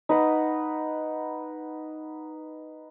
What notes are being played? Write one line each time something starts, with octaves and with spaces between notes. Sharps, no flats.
D#4 B4 F#5